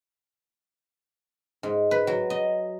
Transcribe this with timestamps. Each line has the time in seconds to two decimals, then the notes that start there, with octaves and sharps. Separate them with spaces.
1.63 G#2
1.91 B4
2.07 F#3
2.30 D#5